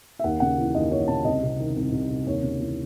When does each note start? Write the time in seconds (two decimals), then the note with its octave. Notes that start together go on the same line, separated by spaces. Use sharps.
0.19 E5
0.24 D#2 F#5
0.40 C#3 F#5
0.58 E3
0.75 D#2 D#5
0.91 D#2 C#5
1.08 C#3 A5
1.24 C2 D#5
1.43 C3
1.59 D#3
1.76 C2
1.92 C2
2.10 C3
2.26 D#2 C#5
2.43 C#3
2.60 E3